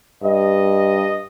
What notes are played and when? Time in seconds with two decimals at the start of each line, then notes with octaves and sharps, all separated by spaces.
0.23 G2 D#5